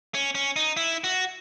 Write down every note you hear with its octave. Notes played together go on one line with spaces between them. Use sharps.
C#4
C#4
D#4
E4
F#4